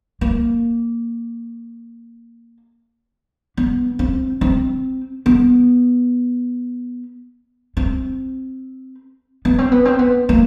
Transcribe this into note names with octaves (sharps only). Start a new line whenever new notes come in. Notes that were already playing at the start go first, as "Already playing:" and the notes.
A#3
B3
C4
C4
B3
C4
B3
C4
B3
C4
B3
A#3